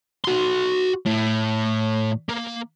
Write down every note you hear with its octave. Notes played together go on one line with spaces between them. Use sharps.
F#4 C6
A2
A#3